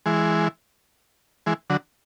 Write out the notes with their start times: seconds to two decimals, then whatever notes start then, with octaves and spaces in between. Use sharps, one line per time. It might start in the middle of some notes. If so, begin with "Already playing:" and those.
0.06 E3 G#3
1.46 E3 G#3
1.70 D3 F#3